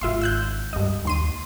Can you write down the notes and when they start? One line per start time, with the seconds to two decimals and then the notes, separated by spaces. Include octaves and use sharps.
0.01 G#1 D3 F4 E5 C6
0.22 E6 F#6 G6
0.73 C#2 G2 G3 D#5
1.05 D#2 C6 D#7